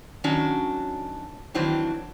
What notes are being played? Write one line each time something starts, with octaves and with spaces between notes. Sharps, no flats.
D#3 F#3 C#4 D4 F#4
D#3 E3 F#3 C4 D4 E4